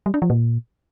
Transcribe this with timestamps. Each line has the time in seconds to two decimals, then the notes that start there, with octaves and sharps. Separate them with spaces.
0.06 G3
0.14 D4
0.22 F3
0.30 A#2